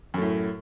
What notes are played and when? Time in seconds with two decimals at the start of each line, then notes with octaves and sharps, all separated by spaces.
0.14 F#2
0.18 A3
0.22 A2